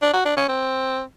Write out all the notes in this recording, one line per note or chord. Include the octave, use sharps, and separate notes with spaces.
D4
F#4
D4
C#4
C4